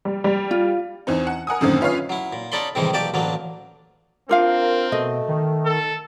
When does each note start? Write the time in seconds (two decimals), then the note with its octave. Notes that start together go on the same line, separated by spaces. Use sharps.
0.05 G3
0.24 G3
0.51 F4
1.07 E2 E3 C4 D#4
1.27 F#5
1.47 A#4 F#5 G#5 D#6
1.61 F#2 A2 D3 D#3 A#3 C4
1.81 C#4 F4 B4 C#5 F5
2.09 F#3 E4
2.33 A#2
2.52 C#4 D#4 A4 D5 B5 C6
2.75 A2 C3 D#3 E3 G3 G#3
2.93 B1 A#3 G4 D5 A5
3.14 A1 D2 F#3 A#3 D4
4.29 C4 D4 F4 A#4 F5
4.92 B2 A3 D#5
5.28 D#3
5.65 A4